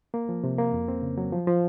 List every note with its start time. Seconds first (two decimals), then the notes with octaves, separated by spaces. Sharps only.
0.14 A#3
0.29 F3
0.44 C3
0.58 A#3
0.73 F2
0.88 C4
1.02 C#3
1.18 F#3
1.33 F3
1.47 F3